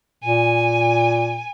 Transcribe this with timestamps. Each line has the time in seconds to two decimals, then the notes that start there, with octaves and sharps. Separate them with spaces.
0.24 A#2 G#5